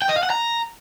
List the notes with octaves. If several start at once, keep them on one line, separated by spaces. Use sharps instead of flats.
G5
D#5
F5
F#5
A#5